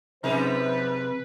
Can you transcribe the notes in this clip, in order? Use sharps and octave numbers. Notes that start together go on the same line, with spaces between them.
F2 C3 D#4 G#4 B4 C5